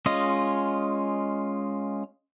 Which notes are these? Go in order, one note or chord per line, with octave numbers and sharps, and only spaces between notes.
G#3 C#4 F4 D#5